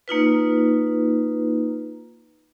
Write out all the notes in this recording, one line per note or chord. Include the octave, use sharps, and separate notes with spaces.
A#3 D#4 F4 B4